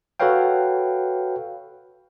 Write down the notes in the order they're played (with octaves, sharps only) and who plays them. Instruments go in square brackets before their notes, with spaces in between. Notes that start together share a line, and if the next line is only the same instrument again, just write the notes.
[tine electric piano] F#4 A4 B4 C#5 F5 G5